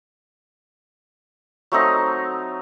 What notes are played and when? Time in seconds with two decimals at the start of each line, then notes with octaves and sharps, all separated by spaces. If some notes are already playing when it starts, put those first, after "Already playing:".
1.72 F#3 A3 C4 D#4